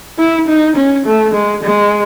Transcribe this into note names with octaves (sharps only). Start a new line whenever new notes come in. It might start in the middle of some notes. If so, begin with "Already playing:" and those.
E4
D#4
C#4
A3
G#3
G#3